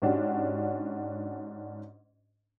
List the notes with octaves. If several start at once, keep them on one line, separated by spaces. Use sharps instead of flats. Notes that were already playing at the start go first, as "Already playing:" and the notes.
G#2 C#4 D4 F#4 G4